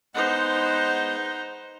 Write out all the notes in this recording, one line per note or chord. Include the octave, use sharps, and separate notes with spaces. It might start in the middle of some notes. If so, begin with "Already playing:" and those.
G#3 B3 D#4 C5 F#5